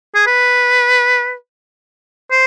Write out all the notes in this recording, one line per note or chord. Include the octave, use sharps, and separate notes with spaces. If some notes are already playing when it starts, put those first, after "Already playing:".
G#4
B4
C5